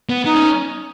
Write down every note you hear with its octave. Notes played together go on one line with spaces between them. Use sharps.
B3
B3 D#4
C#4